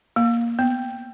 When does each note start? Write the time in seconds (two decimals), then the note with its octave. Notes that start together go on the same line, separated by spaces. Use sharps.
0.16 A#3
0.59 B3